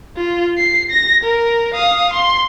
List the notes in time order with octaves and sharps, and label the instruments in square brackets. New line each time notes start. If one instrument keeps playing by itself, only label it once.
[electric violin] F4
C7
A#6
A#4
F5 D#6
C6